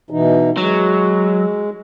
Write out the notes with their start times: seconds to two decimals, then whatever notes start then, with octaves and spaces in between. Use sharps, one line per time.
0.10 B2 E3 D#4
0.57 F#3 G#3